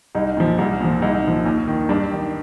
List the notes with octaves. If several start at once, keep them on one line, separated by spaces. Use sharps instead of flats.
C2 D#4
A#2 F3
C2
A#2 F3
C2 D#4
A#2 F3
D#2
D#3
G2 D4
D#3